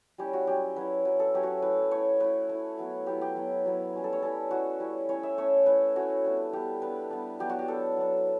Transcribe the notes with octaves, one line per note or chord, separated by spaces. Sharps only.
G3 C#4 E4 G4
F#4
F#3 C#4 E4 G4
F#3 C#4 E4 B4
F#3 C#4 E4 B4
A4
F#3 C#4 E4 G4
F#4
A3 E4 B4
A3 E4 C#5
A3 E4 B4
A3 E4
F#3 B3 E4
F#3 B3 E4 G4
G4
F#3 B3 E4
F#3 B3 E4
G3 C#4 E4
A4
C#5
G3 C#4 E4 A4
G3 C#4 E4 F#4
G3 C#4 E4
A3 C#4 E4 C#5
E5
A3 C#4 E4 C#5
A3 C#4 E4 B4
A3 C#4 E4 F#4
G3 B3 D4
G3 B3 D4 G4
G3 B3 D4 B4
G3 B3 D4
F#3 B3 D4 G4
F#4
G4
F#3 B3 D4 A4
F#3 B3 D4